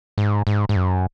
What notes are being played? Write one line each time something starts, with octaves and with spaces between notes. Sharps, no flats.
G#2
G#2
G#2
F#2